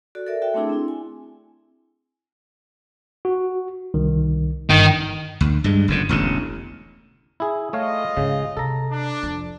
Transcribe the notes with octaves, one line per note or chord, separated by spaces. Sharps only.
F#4 A4 D5
A4 A#4 D5 E5
F#4 A4 E5 G5
A3 C4 D4 E4 G#4
C4 E4
G#5
F#4
C2 D#3
G1 G2 D#3
D2
G2 G#3
F#1 F2 D3
E1 A1 D3
E4 G#4
A3 F4 C#5 D#5 F5
G#2 C#3
C3 A4 A#5
D4
F2 F3